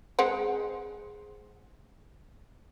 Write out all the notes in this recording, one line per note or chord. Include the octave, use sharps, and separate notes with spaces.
G#3 C4 F#5